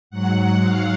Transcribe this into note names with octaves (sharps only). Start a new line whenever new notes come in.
G#2 F#3 F#5
F5